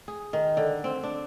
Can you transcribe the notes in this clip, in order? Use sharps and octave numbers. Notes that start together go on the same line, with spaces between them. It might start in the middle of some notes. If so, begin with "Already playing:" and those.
G#4
D#3
D3
C4
D4